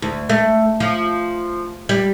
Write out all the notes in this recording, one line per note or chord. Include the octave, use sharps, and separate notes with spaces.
D2
A3
F3
G3